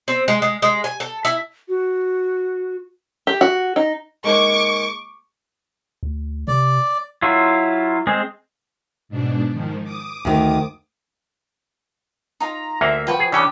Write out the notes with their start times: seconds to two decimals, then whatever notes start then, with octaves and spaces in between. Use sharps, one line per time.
0.08 C4
0.28 G#3
0.42 G#3
0.62 G#3
0.84 G#5
1.00 A4
1.25 E4
1.69 F#4
3.27 G4
3.41 F#4
3.76 D#4
4.24 G#3 A#3 D#4 C#6 D6
6.03 D2
6.48 C3 D5
7.22 F#3 E4 F4
8.07 G#3 C4 G#4
9.09 G#2 B2 D4
9.52 G#2 D#3 F3
9.83 D6 D#6
10.25 D2 D#3
12.40 D#4 F4 A#5
12.81 D2 A#3 E5
13.07 F3 F#4 B4 G5
13.19 G#4
13.32 C#3 E3 C#4 D4 G4 G5 D6